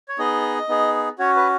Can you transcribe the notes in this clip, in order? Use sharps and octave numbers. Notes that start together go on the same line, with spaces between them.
C#5
B3 D#4 G#4 D#5
B3 D#4 G#4
C#4 F#4 C#5
B4